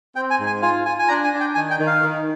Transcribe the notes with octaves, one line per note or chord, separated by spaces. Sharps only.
C4 G5
G#5
G#2
G#5
F4 G#5
F4 G#5
G#5
D4 A#5
G#5
D4
G5
D#3 G#5
G5
D#3
F5
D#3